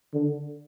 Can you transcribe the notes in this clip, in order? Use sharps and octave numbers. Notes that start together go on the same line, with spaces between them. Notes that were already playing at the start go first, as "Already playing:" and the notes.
D3